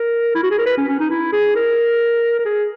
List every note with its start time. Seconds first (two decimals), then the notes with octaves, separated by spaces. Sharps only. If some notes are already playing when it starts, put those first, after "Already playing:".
Already playing: A#4
0.35 E4
0.43 F#4
0.51 G#4
0.58 A#4
0.66 B4
0.77 C#4
0.88 C#4
1.00 D#4
1.10 E4
1.32 G#4
1.55 A#4
2.39 A#4
2.45 G#4